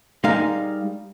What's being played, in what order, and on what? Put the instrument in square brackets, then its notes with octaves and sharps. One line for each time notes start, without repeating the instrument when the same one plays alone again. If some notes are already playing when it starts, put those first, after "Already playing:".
[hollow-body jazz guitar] G3 G#3 D#4 A#4 F5